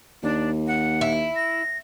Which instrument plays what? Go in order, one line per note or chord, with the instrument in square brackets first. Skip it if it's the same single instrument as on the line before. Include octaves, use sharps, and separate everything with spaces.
[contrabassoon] D#2 [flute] D4
[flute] F#5
[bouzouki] E4
[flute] A#6